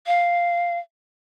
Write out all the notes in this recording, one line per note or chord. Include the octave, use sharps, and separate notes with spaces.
F5